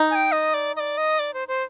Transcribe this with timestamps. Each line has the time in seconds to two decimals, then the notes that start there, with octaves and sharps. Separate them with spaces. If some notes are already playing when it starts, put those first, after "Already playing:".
Already playing: D#4
0.11 G#5
0.15 G5
0.32 D#5
0.54 D5
0.76 D#5
0.80 D5
0.97 D#5
1.19 D5
1.34 C5
1.48 C5